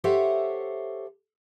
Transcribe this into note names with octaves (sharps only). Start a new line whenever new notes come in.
G4 A4 C5 C#5 E5 F#5